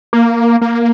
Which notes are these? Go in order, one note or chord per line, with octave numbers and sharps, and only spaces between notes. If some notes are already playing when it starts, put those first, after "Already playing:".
A#3
A#3